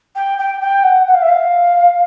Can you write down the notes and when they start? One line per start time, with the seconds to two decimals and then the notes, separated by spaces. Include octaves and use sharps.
0.16 G5
0.38 G5
0.61 G5
0.83 F#5
1.07 F#5
1.14 F5
1.22 E5
1.29 F5